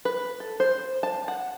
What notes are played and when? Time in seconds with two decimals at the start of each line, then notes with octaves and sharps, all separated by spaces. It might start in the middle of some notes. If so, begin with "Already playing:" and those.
0.05 B4
0.40 A4
0.60 C5
1.03 A5
1.28 F#5